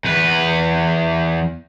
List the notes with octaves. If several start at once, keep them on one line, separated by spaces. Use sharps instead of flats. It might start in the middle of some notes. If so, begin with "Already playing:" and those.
E2 B4